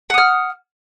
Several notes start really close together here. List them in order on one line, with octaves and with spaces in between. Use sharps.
F#5 D#6 F6